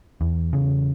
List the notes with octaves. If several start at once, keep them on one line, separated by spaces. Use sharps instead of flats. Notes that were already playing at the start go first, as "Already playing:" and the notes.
E2
C#3